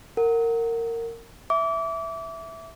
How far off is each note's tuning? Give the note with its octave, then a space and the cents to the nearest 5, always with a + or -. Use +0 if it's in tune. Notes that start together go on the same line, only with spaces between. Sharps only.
A#4 -20 F#5 +0
E5 +0 D6 -30